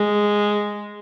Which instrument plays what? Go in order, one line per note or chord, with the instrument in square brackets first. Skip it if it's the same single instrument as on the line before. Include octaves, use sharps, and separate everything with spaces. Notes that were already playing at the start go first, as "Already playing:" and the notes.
Already playing: [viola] G#3